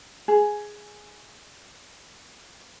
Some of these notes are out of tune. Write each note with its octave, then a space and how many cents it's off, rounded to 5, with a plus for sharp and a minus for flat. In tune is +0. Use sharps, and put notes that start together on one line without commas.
G#4 +5